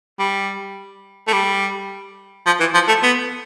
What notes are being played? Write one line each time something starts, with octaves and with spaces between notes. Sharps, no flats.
G3
A3
G3
F3
E3
F3
A3
B3